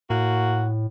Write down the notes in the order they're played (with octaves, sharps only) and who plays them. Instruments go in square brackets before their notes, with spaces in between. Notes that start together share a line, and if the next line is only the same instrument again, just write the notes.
[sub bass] A2 [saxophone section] A#3 F#4